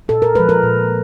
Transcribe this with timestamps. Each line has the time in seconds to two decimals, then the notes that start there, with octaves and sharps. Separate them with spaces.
0.08 A#2 A4
0.22 A#4
0.35 G#3 B4
0.39 F3
0.49 A#4
0.63 A#2